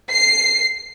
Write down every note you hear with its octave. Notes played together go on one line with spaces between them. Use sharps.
C7